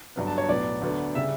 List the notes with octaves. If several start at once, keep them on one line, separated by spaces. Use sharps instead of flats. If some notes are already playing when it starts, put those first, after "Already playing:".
G1 G2 F#3 B3
A5
C#5
B1 A2 F#3 B3 D5
D2 D3 F#3 B3
C#3 G3 E5